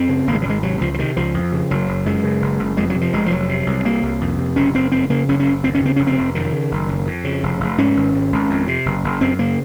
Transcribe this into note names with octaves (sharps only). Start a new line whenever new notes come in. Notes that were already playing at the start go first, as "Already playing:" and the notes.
Already playing: F#2 C4
C#3
G#1 A#3
G#3
F#3
G#1 G#3
C3 F#3
C#2 F3
F3
C3 D#3
C#2 F3
F2
C#3
F#1 F#3
F#1
F#2 G#3
C#3
F#1
F#1
F2 G#3
F#3
C3
F3
F1 G#3
F3
F1 F#3
C3
C2
C3 A#3
C2
F2
C3
F#1 C#4
F#1 C4
F2 C4
C#3 A#3
F#1 C#4
C#4
F#1
D#2 C4
C#4
C#3 C4
F1 C#4
C4
F1
F#2 D#3
C#3
F#1
F#1
F2
C#3
F1
F1
G#2 C#4
G#1
G#2
G#1
F2
C3
F#1
F#1
F#2 C4
C#3 A#3